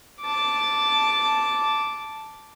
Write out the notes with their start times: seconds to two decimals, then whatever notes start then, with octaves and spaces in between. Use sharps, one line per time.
0.22 A5 D6